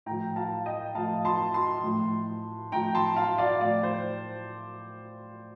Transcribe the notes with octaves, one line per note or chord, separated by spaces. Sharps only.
A2 F3 G5 A#5
F5 A5
D#5 G5
A2 F3 F5 A5
A5 C6
A5 C6
A2 F3
A2 F3 G5 A#5
A5 C6
F5 A5
D5 F5
A2 F3 D5
C5